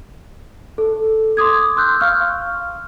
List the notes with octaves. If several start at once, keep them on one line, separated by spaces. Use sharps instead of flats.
A4
C6 D6 D#6 G#6
C6 E6 F#6 G6
F5 C#6 F6